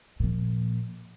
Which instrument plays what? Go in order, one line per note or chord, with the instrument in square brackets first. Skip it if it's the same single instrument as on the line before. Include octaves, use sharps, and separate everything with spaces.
[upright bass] A#2 F3